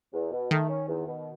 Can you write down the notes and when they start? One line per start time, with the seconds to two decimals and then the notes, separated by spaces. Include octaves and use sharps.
0.13 E2
0.31 B2
0.50 D#3 A3
0.69 C#4
0.88 E2
1.07 B2